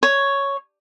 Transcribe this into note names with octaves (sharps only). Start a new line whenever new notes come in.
C#5